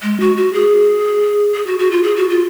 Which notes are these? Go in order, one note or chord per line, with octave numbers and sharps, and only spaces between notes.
G#3
F#4
F#4
G#4
G#4
F#4
F#4
F4
G#4
F#4
F4